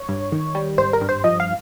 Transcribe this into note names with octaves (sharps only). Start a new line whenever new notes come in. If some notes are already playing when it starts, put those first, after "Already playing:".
Already playing: C#5
G2
D#3
G3
G#1 C5
A#4
G2
C5
F3 D#5
F5